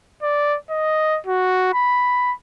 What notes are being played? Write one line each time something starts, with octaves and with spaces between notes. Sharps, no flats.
D5
D#5
F#4
B5